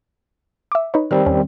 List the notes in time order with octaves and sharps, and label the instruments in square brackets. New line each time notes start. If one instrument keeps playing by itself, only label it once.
[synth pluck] E5 D6
D#4 B4 C#5
[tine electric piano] D#3 G3 C4 [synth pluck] F6
[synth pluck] E2 C#4